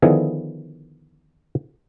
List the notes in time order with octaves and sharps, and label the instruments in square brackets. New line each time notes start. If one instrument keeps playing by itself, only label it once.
[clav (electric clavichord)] D3 D#3 F3 B3 E4 G#4